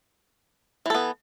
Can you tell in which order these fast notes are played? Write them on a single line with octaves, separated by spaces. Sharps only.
E3 A4 B3